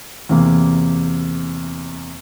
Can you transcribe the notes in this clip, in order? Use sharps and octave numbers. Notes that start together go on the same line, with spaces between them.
E2 C3 A#3